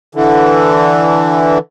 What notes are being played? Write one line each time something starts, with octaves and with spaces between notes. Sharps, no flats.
D3 E3